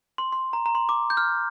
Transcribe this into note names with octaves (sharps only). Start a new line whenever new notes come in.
C6
C6
A#5
A#5
C6
D6
G6
F6